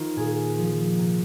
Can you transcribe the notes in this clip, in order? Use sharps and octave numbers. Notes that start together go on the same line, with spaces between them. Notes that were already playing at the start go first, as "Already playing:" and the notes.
Already playing: D#3 F4 C5
A#2 G#4
F3
C3